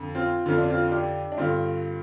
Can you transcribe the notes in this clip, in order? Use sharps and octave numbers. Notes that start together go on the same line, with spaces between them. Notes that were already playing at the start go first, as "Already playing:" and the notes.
Already playing: F2 D3
C4 F4
F2 D3 F4
D4
C4 F4
F4
D4 G4
D4
G2 D3 C4 F4